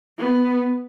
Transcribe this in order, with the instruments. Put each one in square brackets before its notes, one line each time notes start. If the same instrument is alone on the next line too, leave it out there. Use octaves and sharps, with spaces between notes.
[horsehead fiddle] B3